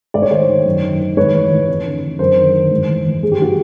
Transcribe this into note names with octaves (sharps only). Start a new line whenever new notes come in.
G#2 D5
C#5
D#3 C5 D5
D#3
F#2
D#3
D#3
G#2 B4 C#5
E3
E3
F2
D3
D3
F#2 A#4 C5
D#3
D#3
G#2
E3
E3
G2 G#4
G4
E3 F#4 G#4